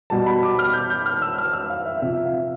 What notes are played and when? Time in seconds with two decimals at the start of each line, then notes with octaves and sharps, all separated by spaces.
0.10 B2 G3 A5
0.26 B5
0.43 D6
0.59 F6
0.74 G6
0.90 G6
1.06 F6
1.22 E6
1.38 F6
1.53 E6
1.70 F5
1.86 E5
2.02 C3 F3 E5
2.25 F5